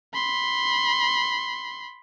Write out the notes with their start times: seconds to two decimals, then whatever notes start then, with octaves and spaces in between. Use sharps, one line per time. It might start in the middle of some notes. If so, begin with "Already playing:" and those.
0.13 B5 C6